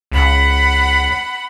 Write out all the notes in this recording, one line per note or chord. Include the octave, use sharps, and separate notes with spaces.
C#2 F#5 B5